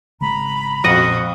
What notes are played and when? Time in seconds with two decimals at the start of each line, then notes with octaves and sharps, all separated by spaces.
0.20 G#1 C#3 G#3 A#5 B5
0.84 A#1 F2 A#2 C#4 F#4 D#5 F#5